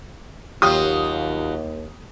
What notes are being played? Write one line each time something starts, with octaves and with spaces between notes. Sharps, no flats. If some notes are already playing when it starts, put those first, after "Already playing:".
D#2 F#3 F4 G4 D#6